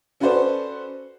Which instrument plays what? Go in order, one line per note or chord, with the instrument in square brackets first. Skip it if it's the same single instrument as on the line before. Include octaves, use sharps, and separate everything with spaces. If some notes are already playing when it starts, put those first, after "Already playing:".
[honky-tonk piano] C#4 F#4 A4 B4 C5 D5